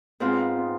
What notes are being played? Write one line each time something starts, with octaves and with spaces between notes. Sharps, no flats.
G#2 G#3 B3 C4 F4
B3